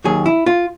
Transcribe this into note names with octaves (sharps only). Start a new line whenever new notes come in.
D#2 D#3 F#3 G#4
E4
F4